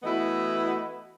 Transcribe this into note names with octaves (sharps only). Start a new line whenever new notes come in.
E3 A3 B3 E4 F#4 D#5